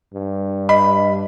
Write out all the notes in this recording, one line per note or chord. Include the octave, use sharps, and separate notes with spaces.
G2
D#5 B5